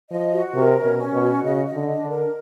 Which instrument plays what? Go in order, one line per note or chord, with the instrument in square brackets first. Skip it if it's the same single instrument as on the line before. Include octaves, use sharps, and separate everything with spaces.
[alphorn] F3 [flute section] D#5
[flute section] F#4
[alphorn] C3 [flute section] A#4
[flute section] C#4
[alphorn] B2
[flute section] C#4
[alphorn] B2
[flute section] F#4
[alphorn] C#3 [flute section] D#5
[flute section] D#5
[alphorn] D3
[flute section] D4
[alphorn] D3
[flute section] A#4